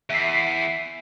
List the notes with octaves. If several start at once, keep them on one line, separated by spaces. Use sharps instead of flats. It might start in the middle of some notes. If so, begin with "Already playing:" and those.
E2 E5 B6 C7